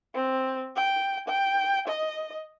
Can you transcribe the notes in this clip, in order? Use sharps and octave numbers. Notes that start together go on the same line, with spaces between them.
C4
G5
G5
D#5